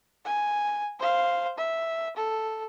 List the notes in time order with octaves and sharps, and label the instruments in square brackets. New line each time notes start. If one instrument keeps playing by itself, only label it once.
[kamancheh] G#5
C5 F5
E5
A4